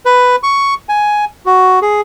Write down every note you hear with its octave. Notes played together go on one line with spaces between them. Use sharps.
B4
C#6
G#5
F#4
G#4